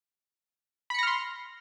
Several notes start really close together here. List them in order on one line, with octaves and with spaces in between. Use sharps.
B5 C#7 A#6 F6 C6